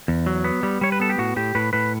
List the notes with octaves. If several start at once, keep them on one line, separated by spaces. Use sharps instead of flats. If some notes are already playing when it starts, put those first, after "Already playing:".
E2
F#3
B3
G3
G3 C#5
B4
B3 A4
G4
A2 F#4
A2 G4
A2 B4
A2 B4